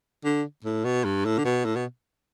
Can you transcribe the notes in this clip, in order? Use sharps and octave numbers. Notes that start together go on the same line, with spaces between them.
D3
A2
B2
G2
A2
D3
B2
A2
B2